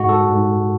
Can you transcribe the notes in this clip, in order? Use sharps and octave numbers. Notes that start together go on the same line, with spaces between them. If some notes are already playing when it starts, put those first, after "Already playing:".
Already playing: G#2 G#3 F#4
A4
G#2 G#3